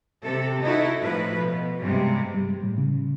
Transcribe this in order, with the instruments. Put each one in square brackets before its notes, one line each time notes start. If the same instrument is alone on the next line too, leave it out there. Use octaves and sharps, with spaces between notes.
[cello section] C3 A4
D#4 E4 F#4 A4
A2 F3 B4
B2
G2 C3 G3 G#3
[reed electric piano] G3
A2
C#3